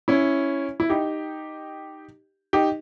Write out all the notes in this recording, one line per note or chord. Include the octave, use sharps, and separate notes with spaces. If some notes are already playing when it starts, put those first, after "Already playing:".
C#4 E4
E4
D#4 G4
D#4 G4